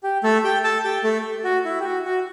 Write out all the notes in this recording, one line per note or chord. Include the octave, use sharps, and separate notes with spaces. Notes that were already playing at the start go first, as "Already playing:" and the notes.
G4
A3 A4
G4 G5
A4 A5
G4 G5
A3 A4
F#4
E4
G4
F#4
F#4